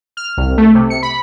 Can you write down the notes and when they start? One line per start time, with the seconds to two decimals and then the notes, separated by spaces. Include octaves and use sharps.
0.17 F6
0.37 C2
0.57 A3
0.75 C3
0.90 C#7
1.03 B5